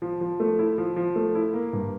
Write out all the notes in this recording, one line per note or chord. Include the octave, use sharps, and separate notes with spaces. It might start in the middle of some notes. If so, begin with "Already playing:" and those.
F3
F3
A3
E4
F3
F3
A3
E4
A#3
G2